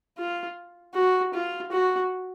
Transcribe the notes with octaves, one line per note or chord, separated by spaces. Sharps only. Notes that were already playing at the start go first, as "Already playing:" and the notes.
F4
F#4
F4
F#4